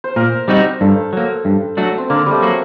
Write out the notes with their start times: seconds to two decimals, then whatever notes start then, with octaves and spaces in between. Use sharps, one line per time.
0.04 C5
0.16 A#2 A#4
0.48 G3 C4 D#4 F#4
0.81 G2 A4
1.13 F#3 A#3
1.45 G2
1.77 F#3 A3 D4 F#4
1.98 C4
2.10 D3 A#3
2.26 G3 A3
2.42 F#3 A#3 F#4